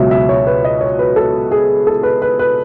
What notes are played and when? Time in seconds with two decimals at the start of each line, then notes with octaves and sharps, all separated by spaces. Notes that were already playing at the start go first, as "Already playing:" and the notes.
Already playing: C#2 B2 F#3 E5
0.11 E5
0.29 C#5
0.47 B4
0.64 D#5
0.81 C#5
0.99 B4
1.16 A4
1.51 G#4
1.87 A4
2.03 B4
2.22 B4
2.39 B4